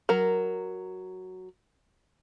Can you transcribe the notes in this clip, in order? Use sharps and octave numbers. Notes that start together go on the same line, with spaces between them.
F#3 A#4